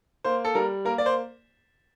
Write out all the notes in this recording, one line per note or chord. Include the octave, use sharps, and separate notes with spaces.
A#3 C5
A4
G3 A#4
A#3 A#4
D5
C5